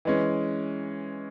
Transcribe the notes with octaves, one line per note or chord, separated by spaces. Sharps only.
E3 G#3 C#4